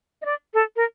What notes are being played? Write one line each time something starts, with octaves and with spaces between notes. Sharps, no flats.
D#5
D5
A4
A#4